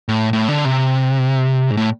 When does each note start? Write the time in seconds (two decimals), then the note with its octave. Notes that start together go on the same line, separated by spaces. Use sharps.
0.09 A2
0.33 A2
0.48 D3
0.65 C3
1.71 G#2
1.77 A2